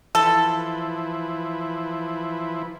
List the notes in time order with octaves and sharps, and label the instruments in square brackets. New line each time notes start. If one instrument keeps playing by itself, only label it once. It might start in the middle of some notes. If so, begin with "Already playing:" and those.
[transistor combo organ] E3 F3 E4 [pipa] A4